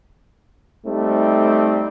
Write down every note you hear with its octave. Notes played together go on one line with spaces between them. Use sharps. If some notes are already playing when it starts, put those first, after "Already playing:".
G3 A3 C4 D#4